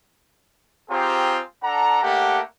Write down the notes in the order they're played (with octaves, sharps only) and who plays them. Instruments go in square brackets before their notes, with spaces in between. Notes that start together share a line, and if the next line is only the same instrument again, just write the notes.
[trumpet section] C4 F4 G4 G#4 C5 A#5
D4 A4 F#5 A#5
A3 A#3 D4 G4 F#5